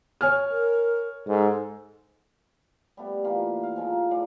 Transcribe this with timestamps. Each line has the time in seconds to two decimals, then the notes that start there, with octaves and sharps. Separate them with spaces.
0.21 C#5 G#5 F6
0.51 A#4
1.28 G#2 A4
2.97 G3 A3 B3
3.25 E3 A#3 F4 G4
3.63 F5
3.76 F3 G#3 D#4
3.90 A5
4.11 A2 G#3 D5 F5